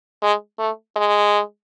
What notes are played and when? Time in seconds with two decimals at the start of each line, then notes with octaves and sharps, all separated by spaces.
0.22 G#3
0.58 A3
0.96 G#3